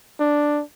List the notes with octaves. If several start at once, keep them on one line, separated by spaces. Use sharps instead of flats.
D4